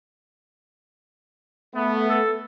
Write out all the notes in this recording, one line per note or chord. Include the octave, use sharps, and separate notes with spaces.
A3 B3
A4